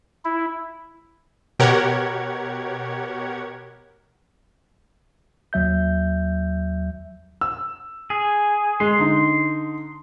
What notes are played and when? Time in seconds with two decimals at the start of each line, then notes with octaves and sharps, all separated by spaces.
0.25 E4
1.59 B2 G4 A#4 C#5 F#5 G#6
5.53 D#2 F#3 E5 G6
7.41 E6
8.10 G#4
8.80 G#3 C6
8.99 D3 D#4